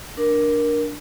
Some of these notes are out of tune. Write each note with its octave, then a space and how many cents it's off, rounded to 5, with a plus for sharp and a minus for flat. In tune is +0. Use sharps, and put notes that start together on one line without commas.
D4 +0 A#4 +15